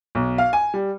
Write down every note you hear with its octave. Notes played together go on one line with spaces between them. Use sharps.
B1
F5
G#5
G3